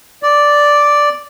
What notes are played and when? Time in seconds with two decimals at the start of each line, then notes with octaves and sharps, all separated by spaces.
0.23 D5